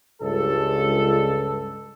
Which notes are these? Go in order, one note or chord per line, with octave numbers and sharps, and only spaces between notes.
C#2 G2 A4